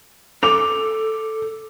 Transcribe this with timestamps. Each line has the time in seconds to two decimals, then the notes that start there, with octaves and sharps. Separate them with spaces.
0.43 A4 D6 F7